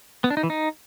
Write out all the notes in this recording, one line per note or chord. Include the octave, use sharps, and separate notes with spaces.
B3
D4
D#4
E3
D#4